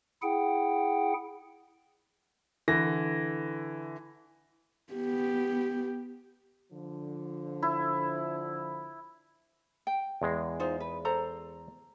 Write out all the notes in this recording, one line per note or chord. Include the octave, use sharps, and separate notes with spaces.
E4 G#4 F#5 G5
D3 E3 A#6
B3 G4
D3 F3
E4
G5
E2 G#3
D#4 F4 C5
B4
A4 C5 A#5